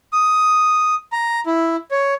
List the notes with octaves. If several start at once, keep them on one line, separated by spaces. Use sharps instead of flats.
D#6
A#5
E4
C#5